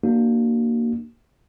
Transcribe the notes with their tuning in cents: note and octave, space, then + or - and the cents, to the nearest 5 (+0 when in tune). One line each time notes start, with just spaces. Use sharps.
A#3 +0 D4 +25 F#4 +20